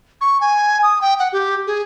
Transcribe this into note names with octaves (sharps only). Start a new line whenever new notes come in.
C#6
G#5
D#6
G5
F#5
G4
G#4